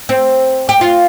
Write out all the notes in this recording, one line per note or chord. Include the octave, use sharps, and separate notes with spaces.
C4
G4
F4